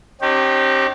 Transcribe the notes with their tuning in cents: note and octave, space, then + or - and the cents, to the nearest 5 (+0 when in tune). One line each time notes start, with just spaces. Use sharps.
C4 +45 D#4 -40 G4 -20